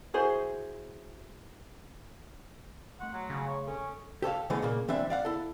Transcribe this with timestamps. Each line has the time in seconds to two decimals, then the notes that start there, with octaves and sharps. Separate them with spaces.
0.14 E4 F#4 G#4 C5
3.00 A3 F#5 C6
3.14 F#3
3.30 C#3
3.48 C#5
3.67 C#4 A4
4.22 G4 A4 C#5 F5
4.50 C#3 E3 G#3 A3 B3
4.62 A#2 C#3 A#3
4.88 E3 G3 C4 D4 E5
5.10 D5 F5 F#5
5.25 E4 A4